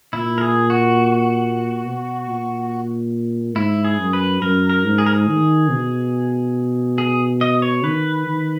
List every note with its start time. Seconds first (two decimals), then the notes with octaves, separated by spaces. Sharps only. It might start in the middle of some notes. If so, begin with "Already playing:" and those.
0.13 A#2 E4
0.38 A#4
0.41 G#4
0.70 F#4
1.85 B2
2.28 A#2
3.55 G#2 E4
3.85 G#4
3.99 F#2
4.13 B4
4.41 F#2 A#4
4.70 A#4
4.84 G#2
4.98 G#4
5.06 A#4
5.14 G#4
5.27 D#3
5.69 B2
6.98 G#4
7.41 D#5
7.62 C#5
7.84 D#3 B4
8.27 D#3